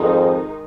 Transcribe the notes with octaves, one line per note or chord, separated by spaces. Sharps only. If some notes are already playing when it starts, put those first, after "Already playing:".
Already playing: F2 G#2 D#3 G#3 D#4